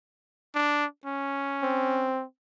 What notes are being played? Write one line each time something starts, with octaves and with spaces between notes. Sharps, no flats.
D4
C#4
C4